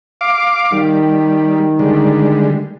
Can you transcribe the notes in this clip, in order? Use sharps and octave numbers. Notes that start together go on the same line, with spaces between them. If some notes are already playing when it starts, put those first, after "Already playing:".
F5 D6
D#3 G3
D3 G3 G#3